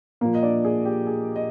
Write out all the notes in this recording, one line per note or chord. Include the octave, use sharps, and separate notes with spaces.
A#2 F3 A#3 A#4
D#5
D4 D5
G#4
G4
G#4
D#5